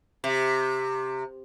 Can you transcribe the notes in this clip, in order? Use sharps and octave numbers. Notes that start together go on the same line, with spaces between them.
C3